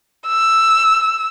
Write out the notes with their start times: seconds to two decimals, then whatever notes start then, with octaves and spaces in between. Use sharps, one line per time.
0.27 E6